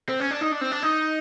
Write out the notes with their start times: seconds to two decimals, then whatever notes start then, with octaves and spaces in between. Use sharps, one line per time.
0.09 C4
0.20 C#4
0.31 D4
0.41 D#4
0.52 D4
0.61 C4
0.71 D4
0.83 D#4